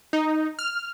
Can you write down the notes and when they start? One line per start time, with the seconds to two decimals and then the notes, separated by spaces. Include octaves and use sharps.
0.13 D#4
0.59 F6